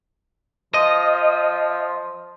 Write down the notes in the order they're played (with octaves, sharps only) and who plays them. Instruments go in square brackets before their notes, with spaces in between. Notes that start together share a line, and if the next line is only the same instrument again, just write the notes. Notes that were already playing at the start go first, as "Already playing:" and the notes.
[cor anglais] F3 [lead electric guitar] D#5